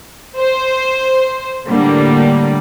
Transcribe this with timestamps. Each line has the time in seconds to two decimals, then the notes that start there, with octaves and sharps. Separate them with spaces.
0.38 C5
1.68 A2 D3 G3 A#3